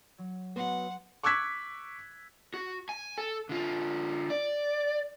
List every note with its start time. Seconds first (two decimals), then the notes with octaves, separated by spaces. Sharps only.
0.18 F#3
0.56 F#3 B3 F#5 C6
1.23 C#6 D6 E6 F#6 G#6 B6
2.54 F#4
2.89 G#5
3.18 A4
3.49 D3 F4
4.30 D5